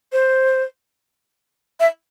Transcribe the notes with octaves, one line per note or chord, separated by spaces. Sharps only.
C5
E5